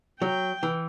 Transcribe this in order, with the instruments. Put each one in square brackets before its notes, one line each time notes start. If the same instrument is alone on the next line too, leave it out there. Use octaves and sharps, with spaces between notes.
[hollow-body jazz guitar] F#3 [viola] G5
[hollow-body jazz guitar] E3